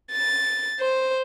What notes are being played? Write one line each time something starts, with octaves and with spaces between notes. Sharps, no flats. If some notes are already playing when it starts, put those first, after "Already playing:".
A6
C5